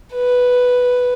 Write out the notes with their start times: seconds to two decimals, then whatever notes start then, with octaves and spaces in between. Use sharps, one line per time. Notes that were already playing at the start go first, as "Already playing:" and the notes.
0.14 B4